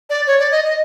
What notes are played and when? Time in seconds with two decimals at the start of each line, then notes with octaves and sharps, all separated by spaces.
0.10 D5
0.27 C#5
0.39 D5
0.51 D#5
0.64 D#5